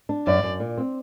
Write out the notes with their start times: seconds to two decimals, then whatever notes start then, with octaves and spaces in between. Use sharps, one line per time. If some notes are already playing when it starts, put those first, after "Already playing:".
0.09 D4
0.27 F#2 D5
0.43 F#2
0.60 A#2
0.78 C4